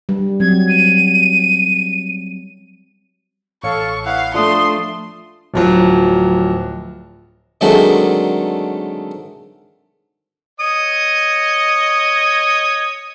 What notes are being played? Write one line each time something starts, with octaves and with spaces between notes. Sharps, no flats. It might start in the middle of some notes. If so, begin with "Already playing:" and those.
G3
F#3 C4 G#6
D#7
A1 A4 C#5 F5 C#6 C#7
B3 E4 F5 F#5
F3 A3 D4 F5 C6 D#6
D1 F3 F#3
D3 D#3 F#3 G#3 A3 C4
C#5 D#5 D#6